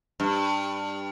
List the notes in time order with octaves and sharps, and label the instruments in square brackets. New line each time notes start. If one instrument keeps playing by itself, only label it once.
[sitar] G2